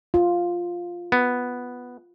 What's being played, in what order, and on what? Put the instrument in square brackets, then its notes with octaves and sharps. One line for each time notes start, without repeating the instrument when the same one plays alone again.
[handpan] F4
[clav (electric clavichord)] B3